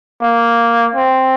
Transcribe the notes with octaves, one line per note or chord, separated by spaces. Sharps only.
A#3
C4